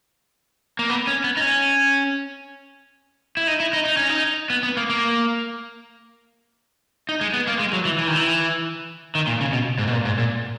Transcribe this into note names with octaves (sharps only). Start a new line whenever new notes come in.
A#3
B3
C#4
B3
D#4
C#4
E4
D#4
E4
D#4
D#4
C#4
D#4
B3
B3
A#3
A#3
D#4
G#3
B3
A#3
G#3
F#3
E3
E3
D#3
E3
D#3
A#2
C#3
B2
G#2
B2
A#2
G#2
A#2